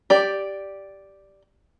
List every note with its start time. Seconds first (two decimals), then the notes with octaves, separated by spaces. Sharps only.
0.10 G4 D5